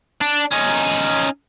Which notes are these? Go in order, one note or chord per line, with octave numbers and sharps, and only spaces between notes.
D4
C#4 D#4